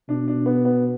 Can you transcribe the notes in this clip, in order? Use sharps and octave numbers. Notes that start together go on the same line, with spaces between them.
B2 D4
D4
B3
B3